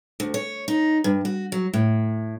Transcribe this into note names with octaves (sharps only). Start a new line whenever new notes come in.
D2
C#5
D#4
G2
F#4
F#3
A2